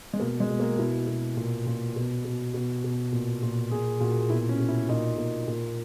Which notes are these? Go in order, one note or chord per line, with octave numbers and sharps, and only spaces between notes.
G#3
B2 A#3
G#3
B2
A#3
B2 E4
B2
A#2
A#2
B2
B2
B2
B2
A#2
A#2
A#2 G#4
A#2 F#4
B2 E4
C#4
B2
E4
A#2 D#4
A#2
A#2